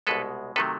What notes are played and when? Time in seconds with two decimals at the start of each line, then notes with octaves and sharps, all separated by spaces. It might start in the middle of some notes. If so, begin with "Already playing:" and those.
0.07 C2 B2 G#3 A4 B4
0.56 C3 D#3 F#3 A3 A4 B4